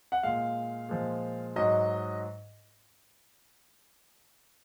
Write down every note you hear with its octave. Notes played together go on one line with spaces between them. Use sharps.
F#5
A#2 G#3 F5
A#2 F3 G#3
G#2 F#3 D#5